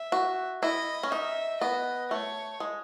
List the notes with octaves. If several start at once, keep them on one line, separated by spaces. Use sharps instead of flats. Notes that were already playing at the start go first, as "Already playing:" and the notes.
Already playing: E5
F#4
E4 D#5
C#4
D#4 E5
B3 D#5
A3 C#5
G#3